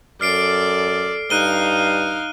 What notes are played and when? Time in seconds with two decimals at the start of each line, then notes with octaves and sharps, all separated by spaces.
0.21 F#2 A4 D5 F6 C7 D7
1.30 G2 D#4 F5 F#6 D#7 G7